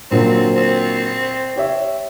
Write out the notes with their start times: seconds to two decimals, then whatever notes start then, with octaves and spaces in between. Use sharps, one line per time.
0.11 A#2 D3 F#3 C4
0.56 C4
1.56 G4 C#5 E5